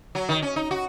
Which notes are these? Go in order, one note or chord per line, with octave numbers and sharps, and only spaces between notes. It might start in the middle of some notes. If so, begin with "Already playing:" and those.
F#3
D#3
C#4
D#4
F#4